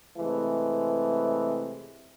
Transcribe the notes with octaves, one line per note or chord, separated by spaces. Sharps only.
C3 E3 G#3 A3